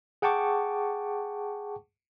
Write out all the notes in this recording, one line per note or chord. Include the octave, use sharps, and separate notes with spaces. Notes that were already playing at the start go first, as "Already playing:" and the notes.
G#4 F#5 G5 A5 C#6 D6